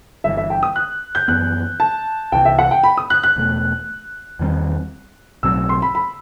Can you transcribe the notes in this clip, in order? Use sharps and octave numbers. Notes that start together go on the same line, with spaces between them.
G1 G2 E3 E5
E5
G5
D#6
F#6
G6
F#2 E3 B3 F#6
A5
C2 C3 E3 G5
E5
F#5
G5
B5
D#6
F#6
F#6
E1 E2 B2 A3
E2 D#3 G3 C4
B1 A2 F#3 C4 E6
C6
B5
B5